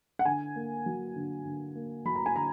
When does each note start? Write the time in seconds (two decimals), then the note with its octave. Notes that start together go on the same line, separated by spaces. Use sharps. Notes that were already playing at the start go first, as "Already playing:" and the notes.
0.19 F#5
0.25 D3 G#5
0.56 A#3
0.86 F#3
1.16 D3
1.45 D3
1.75 A#3
2.05 F#3 B5
2.16 A#5
2.26 G#5
2.36 D3 A#5